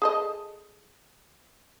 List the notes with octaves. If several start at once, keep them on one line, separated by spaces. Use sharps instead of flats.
G#4 A4 D#5